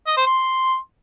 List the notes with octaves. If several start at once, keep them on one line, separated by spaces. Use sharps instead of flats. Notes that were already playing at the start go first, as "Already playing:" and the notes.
D#5
C5
C6